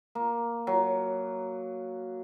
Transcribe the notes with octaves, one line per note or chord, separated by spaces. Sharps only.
A#3
F#3